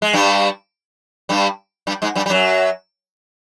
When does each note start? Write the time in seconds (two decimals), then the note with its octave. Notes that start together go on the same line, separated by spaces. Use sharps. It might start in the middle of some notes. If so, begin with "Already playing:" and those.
0.02 G#3
0.14 G2 G3
1.29 G2 G3
1.87 G2 G3
2.02 G#2 G#3
2.15 G2 G3
2.26 G3
2.30 F#2 F#3